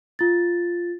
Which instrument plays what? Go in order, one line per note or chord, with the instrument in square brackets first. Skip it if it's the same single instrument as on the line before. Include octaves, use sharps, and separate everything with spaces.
[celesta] F4 A6